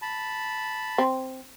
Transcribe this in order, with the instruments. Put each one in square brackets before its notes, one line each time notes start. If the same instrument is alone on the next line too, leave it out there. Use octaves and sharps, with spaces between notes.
[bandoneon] A5 B5
[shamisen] C4